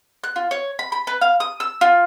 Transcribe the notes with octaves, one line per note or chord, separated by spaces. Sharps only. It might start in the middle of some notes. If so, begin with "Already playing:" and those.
F#6
F4
C#5
B5
B5
B4
F5
D#6
E6
F4